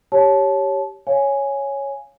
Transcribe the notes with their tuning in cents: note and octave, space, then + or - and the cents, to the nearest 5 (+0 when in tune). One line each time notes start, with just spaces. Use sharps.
G4 -5 C#5 +0 A5 -20
C#5 +0 F5 -5 G#5 +0